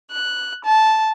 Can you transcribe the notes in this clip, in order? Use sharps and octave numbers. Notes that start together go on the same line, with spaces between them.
F#6
A5